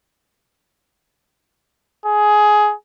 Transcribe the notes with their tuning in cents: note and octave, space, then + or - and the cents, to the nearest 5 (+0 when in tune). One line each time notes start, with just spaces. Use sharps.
G#4 +15